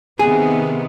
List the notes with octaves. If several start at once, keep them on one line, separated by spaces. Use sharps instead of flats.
C3 D#3 B3 G#4